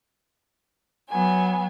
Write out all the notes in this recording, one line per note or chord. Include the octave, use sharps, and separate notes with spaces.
F#3 B3 G#5